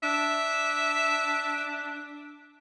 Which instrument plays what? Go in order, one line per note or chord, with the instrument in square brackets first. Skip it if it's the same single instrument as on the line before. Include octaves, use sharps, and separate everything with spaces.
[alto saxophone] D4 [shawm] E5